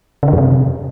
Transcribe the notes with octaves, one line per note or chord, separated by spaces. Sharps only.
C#3
D3
F#2
C3